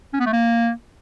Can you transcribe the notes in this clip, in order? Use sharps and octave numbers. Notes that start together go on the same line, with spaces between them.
C#4
B3
A3
A#3